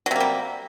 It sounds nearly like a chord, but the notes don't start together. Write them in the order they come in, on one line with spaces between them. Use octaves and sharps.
F#3 C3 A#3 G3